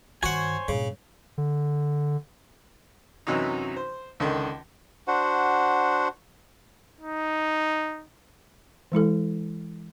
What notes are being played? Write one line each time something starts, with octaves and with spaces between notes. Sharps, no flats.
G2 D#3 F#4 C5 C#5 F#5 G#5
G2 A#2 C#3
D3
F#2 C3 E3 F#3 C#4 D#4
C5
C#2 D3 D#3
D4 F#4 C5 F#5
D#4
E3 G#3 E4 A4